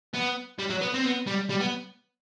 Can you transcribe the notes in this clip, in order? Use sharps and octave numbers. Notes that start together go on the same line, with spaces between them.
B3
G3
F#3
B3
C4
B3
G3
G3
B3